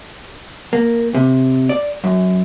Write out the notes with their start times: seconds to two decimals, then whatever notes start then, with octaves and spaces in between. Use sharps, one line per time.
0.73 A#3
1.15 C3
1.69 D5
2.04 F#2